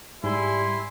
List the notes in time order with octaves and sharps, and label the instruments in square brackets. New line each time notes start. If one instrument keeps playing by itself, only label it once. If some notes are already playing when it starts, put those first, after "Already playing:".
[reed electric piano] G#2 [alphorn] G3 [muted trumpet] E4 [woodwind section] G#5 C6